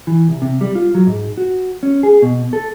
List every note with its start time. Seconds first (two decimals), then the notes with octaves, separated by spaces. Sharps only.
0.07 E3
0.29 C2
0.42 C3
0.61 G3
0.75 F4
0.95 F#3
1.07 G#2
1.37 F#4
1.83 C#4
2.03 G#4
2.22 B2
2.53 A4